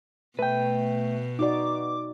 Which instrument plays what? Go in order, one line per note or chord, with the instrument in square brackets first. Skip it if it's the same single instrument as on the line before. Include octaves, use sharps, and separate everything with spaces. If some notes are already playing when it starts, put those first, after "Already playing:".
[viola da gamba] B2 [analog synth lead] A3 [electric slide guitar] B4 G5
[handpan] D#4 F#4 D5 [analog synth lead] D6